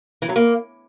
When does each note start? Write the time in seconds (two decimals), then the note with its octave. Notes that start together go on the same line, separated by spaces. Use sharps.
0.22 E3
0.29 F#3
0.36 A#3